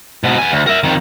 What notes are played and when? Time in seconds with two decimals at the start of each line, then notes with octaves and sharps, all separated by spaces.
0.24 G#2 B2
0.38 B3 G#5
0.52 D2
0.67 A#4 E5
0.83 F2 D#3